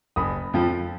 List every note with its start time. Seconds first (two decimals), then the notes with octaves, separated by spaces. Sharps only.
0.16 F#1 B5 D#6
0.54 F2 F3